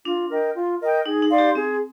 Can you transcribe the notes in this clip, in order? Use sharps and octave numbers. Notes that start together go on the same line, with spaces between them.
D4 F4
A#4 D#5 G5
F4
A#4 D#5 G5
D#4 G#4
D#4
D5 F5 C6
G4
C4 G#4